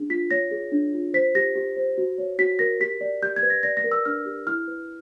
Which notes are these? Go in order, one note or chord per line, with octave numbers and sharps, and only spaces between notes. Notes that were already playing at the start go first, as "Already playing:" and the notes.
Already playing: D4 G#4
F4 B6
C#5 A#6
G#4
D4
F4
C5 B6
G4 A#6
G4
C5
F#4
C#5
F#4 B6
A#4 A#6
G4 B6
D5
G4 G6
G#6
B4
A#6
D5 A#6
A#6
A#4
E6
D4 F6
G4
E4 F6
B4